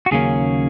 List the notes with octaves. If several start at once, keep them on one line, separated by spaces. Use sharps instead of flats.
F#4
D#2 C#3 F#3 A#3 C#4 G#4